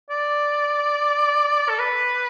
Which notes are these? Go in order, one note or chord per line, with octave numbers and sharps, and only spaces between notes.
D5
A4
B4